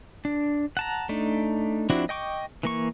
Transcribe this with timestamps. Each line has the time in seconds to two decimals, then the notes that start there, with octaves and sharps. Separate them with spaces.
0.25 D4
0.77 F#5 A5 A#5
1.09 A3 D4 D#4
1.90 F3 C4 D4 E4 F#4
2.09 D#5 G5 C#6 D6
2.63 E3 A#3 C#6